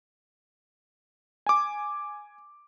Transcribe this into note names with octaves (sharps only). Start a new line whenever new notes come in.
G#5 D6